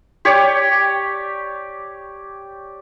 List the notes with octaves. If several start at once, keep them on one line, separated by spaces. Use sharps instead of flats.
G4 C#5 D5